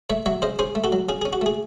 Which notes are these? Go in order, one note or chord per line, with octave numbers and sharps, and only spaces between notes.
A3 C#5 E5
F#3 C#5 E5
C#3 C5 D#5
C#4 G#4 C5
A3
F#4 A4
F#3
C#3 G#4
C#4 G#4
F#4
A3 G#4